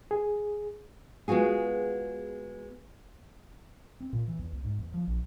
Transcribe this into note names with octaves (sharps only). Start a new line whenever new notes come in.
G#4
G#3 B3 F4 F#4 G#4
C4
A#2
E3
E2
C#2
G#2
E2
F3
A#1